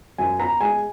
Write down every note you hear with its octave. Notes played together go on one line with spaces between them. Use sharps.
F#2 G#5
B3 A#5
G#3 G#5